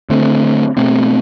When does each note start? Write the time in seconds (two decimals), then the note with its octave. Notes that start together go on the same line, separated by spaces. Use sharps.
0.10 D3 A3 C4
0.77 B2 A3 C4